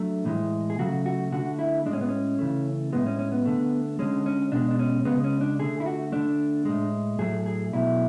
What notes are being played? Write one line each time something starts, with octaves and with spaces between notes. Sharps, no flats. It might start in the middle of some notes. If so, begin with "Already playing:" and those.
Already playing: F#3 A3 D4
A2 E3 G#3
G#4
C#3 F#3 A3 F#4
F#4
D3 A3 F#4
E4
A2 G#3 D4
C#4
B3
C#4
C#3 E3 A3
A2 G#3 B3
C#4
C#4
B3
D3 A3
D3 G#3 C#4
C#4
B2 G#3 D4
D4
C#4
C#3 G#3 B3
C#4
D4
D3 A3 G#4
E4
F#4
D3 A3 D4
A2 G#3
A2 F#3 A3 G#4
G#4
B2 F#3 A3 E4